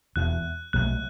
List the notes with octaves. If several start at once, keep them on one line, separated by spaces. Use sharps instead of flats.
E1 E2 B2 F#6
B1 B2 F#3 A3 F#6